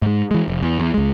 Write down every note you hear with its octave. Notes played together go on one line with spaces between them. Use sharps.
G#2 G#3
E3 G#3
F1
E2
E2
C#2 G#3